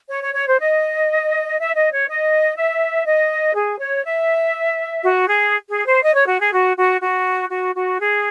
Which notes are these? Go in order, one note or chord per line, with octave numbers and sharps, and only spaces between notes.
C#5
C#5
C#5
C5
D#5
E5
D#5
C#5
D#5
E5
D#5
G#4
C#5
E5
F#4
G#4
G#4
C5
D#5
C#5
F#4
G#4
F#4
F#4
F#4
F#4
F#4
G#4